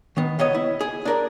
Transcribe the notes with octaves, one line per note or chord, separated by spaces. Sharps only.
D#3 B3
C#2 B3 C#5 D#5
E4
G#4
D4 A#4 D5